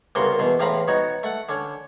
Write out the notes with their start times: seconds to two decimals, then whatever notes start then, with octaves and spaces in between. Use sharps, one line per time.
0.15 C2 C#3 A#3 B3 F#4 C6
0.39 E2 B2 B3
0.59 E2 A2 C4 F5 A#5 B5
0.88 B3 D#4 F#4 C#5
1.23 A3 F#5
1.49 D3 C#4